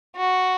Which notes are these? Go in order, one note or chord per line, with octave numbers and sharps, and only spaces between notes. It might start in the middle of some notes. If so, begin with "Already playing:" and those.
F#4